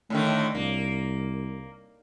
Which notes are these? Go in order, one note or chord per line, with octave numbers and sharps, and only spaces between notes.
A2 D3 D#3 A3
C2 A#3